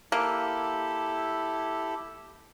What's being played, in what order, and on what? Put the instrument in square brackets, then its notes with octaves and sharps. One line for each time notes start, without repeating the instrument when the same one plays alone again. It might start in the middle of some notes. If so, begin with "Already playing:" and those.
[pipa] A#3 [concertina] E4 G4 A4